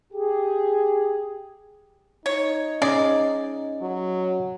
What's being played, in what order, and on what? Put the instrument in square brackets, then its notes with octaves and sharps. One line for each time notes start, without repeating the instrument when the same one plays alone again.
[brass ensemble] G4 G#4
[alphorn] D#4 [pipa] C#5
[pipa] G#3 D5 [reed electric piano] C#4 D#5
[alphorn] F#3